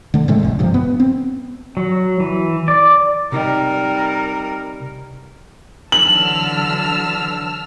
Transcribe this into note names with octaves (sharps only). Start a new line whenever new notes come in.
D3 A3
G#2 C3 G#3 A3
F1 A#1
G2 C3 F3
B3
C4
F#3
E3
D5
C3 G3 D#4 A#4 D#5
D3 E3 F#3 A5 E6 F6 F#7